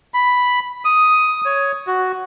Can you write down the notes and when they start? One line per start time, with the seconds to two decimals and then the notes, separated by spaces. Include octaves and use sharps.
0.14 B5
0.85 D#6
1.45 C#5
1.87 F#4